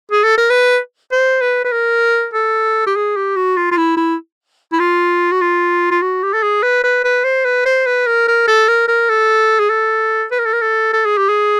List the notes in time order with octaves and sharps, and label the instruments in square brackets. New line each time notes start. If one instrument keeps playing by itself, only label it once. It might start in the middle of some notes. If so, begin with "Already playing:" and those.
[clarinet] G#4
A4
A#4
B4
C5
B4
B4
A#4
A4
G4
G#4
G4
F#4
F4
F4
E4
E4
E4
F4
F#4
F4
F4
F#4
G4
A4
G#4
B4
B4
B4
C5
B4
C5
B4
A#4
A#4
A4
A#4
A#4
A4
G#4
A4
B4
A#4
A4
A#4
A4
A4
G#4
G4
G#4